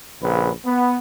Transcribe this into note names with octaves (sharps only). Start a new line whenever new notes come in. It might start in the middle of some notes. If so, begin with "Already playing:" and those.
A#1 C#3 B4
B3